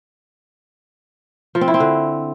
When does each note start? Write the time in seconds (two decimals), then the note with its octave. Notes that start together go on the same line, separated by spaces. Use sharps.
1.55 F3
1.61 C4
1.68 E4
1.74 C4
1.80 D3